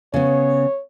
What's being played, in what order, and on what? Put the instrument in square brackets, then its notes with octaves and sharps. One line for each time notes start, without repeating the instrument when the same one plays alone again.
[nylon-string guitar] C#3 B3 [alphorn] C#5